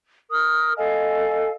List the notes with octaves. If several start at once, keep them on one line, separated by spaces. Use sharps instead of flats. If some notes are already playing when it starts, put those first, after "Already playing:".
A#4 D#6
A4 D#5 F5 G#5